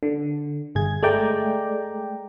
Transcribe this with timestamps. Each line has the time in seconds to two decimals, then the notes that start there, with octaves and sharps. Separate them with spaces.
0.03 D3
0.75 G1 G#4 G#6
1.03 G#3 A3 D5 G5 A#5